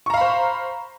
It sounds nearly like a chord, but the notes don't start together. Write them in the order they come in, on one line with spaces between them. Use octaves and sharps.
C#6 A#5 F5 B5 C5